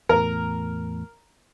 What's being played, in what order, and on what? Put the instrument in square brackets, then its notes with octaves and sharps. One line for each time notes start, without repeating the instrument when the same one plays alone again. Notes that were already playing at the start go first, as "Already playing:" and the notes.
[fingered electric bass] E2 A2 [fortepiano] A#4